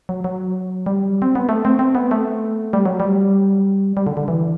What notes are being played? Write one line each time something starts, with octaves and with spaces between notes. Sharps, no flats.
F#3
F#3
G3
C4
B3
A3
C4
C4
B3
A3
G3
F#3
G3
G3
D3
D3
E3